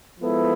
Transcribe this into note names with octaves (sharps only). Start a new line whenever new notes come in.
F3 G#3 B3 E4 A4